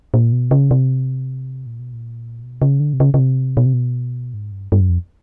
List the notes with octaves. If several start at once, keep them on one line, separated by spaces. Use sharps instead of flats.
A#2
B2
C#3
C3
A#2
B2
A#2
B2
C#3
D3
C3
C#3
C#3
C3
B2
C3
B2
G#2
G2
G2
F#2
F2